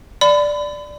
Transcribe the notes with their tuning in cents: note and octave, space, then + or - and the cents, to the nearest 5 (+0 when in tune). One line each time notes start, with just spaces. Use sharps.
D5 +0 B5 +35